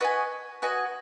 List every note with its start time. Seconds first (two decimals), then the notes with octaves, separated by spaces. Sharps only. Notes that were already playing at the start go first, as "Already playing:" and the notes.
0.01 F#4 B4 D#5 G#5
0.62 F#4 B4 D#5 G#5